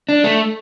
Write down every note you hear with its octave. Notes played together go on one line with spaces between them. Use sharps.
D4
A3